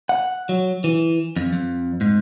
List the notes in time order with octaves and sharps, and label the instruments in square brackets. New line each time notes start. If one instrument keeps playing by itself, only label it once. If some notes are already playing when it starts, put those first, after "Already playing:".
[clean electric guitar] F#5
F#3
E3
F2
F2
G#2